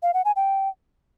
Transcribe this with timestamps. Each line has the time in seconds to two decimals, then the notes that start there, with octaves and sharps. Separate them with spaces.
0.03 F5
0.14 F#5
0.25 G#5
0.36 G5